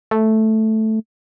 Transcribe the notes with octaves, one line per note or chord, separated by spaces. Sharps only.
A3